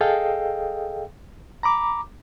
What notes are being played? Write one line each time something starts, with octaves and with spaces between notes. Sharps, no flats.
G#4 A4 D#5 F5 G5
A#5 B5 D6